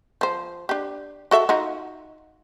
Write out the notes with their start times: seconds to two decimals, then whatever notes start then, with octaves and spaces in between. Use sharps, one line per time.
0.21 F3 C5
0.69 D4 G4
1.31 F#4 A4 E5
1.49 D#4 F4 F#4